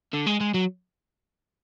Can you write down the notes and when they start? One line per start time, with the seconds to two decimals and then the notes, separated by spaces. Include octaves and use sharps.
0.14 D3
0.27 G#3
0.41 G#3
0.54 F#3